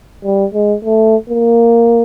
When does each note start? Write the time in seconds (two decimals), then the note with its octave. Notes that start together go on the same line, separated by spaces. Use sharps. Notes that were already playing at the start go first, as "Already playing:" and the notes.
0.24 G3
0.54 G#3
0.85 A3
1.29 A#3